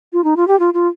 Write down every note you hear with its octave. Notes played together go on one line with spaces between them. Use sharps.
F4
D#4
F4
G4
F4
F4